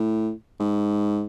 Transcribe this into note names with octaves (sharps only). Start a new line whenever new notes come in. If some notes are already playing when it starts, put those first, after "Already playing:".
Already playing: A2
G#2